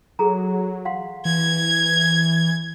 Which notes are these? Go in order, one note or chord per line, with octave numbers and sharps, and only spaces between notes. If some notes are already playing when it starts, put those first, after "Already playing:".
F#3 G#4 A4 A#5
F5 F#5 C6
E3 G#6